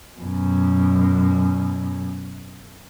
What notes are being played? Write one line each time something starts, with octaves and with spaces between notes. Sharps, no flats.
F#2 B2